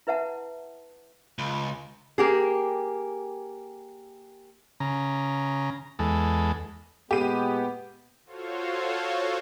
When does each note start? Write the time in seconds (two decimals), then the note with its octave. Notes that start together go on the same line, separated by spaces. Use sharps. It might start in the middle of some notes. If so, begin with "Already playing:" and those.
0.07 E4 B4 E5 F#5 A5
1.39 C#2
2.18 A#3 G4 G#4
4.80 C#3 A#5
5.99 E2 G#3 A4
7.11 A#2 G#3 B3 G4 D#7
8.25 F4 F#4 A4 C5 C#5 F5